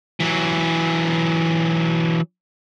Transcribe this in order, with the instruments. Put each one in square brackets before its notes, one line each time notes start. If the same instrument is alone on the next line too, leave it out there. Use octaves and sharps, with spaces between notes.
[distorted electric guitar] E3 F#3